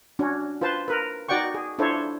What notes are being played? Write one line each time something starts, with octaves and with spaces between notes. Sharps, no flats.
C#4 D4 F#4
F4 B4 C5 A5
A#4 B4
D#4 F#4 D5 F#5 G5 C#6
G#4
D4 E4 F4 A4 C5 C#5